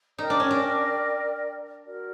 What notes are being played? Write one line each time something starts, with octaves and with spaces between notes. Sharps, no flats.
D#4 A#4 D5 G5
D4
C#4
D4
F#4 A#4 D5